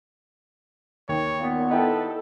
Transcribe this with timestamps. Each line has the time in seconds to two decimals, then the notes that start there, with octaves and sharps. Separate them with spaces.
1.09 D#2 C#5
1.40 A#2 B3
1.70 D#4 E4 A4 B4 G5